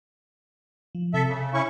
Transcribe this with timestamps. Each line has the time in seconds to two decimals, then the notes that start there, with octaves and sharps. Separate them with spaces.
0.95 F3
1.14 C3 A4 E5
1.28 C#3
1.54 C#4 E4 C#6